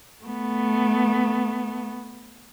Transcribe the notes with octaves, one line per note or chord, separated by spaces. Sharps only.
A3 B3